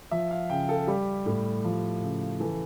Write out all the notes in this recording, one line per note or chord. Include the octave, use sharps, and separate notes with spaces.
F3 E5
F5
C#3 G5
A4
G3 G4
A2
F3
C#3
E3 A4